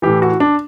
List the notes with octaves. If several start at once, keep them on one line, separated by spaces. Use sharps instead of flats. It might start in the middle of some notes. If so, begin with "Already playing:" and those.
A2 E3 G4
F#4
D4